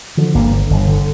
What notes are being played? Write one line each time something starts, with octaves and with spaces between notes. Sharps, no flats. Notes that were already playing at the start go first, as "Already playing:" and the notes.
D3 F3
G1 A#3
D3
G1
D3